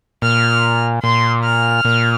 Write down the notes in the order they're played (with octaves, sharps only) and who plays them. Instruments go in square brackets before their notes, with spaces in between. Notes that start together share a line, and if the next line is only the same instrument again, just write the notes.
[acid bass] A#2 [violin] F6
[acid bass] A#2 [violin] C6
[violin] F6
[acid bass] A#2